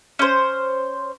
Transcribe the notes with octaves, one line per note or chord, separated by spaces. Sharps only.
C#4 C5